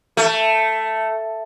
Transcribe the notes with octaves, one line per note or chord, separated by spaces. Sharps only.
A3